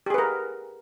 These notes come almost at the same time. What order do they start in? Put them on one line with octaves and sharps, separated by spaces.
G4 G#4 B4 A#4